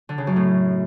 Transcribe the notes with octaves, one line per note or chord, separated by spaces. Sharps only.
D3
C#3
F#2
A2